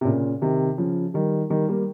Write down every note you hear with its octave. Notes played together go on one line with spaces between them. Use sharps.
C3
A#2 C#3
C3 D#3
C#3 F3
D#3 G3
D#3 G3
G3 A#3